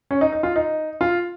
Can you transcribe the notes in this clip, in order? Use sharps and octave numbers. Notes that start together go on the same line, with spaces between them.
C#4
D#4
D#4
F4
D#4
F4